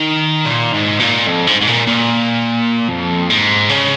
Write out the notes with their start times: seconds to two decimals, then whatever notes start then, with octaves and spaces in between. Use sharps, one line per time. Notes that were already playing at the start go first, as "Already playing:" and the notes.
Already playing: D#3
0.46 A#2
0.73 G#2
1.00 A#2
1.27 F2
1.47 G#2
1.61 G#2
1.68 A#2
1.87 A#2
2.89 F2
3.30 G#2
3.70 C#3